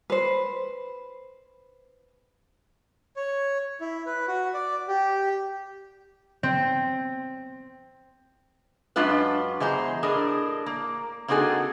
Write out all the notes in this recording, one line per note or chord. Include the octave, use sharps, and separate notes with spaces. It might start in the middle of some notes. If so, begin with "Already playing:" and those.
B4 C5
C#5
E4
B4
F#4
D5
G4
C4
F#2 G#3 D4 F4 B4
E2 G#3 C5 A#5
A2 D4 G#4 A#4 D#5
A#3
A#3 C4 D#4 F#4 G#4 A4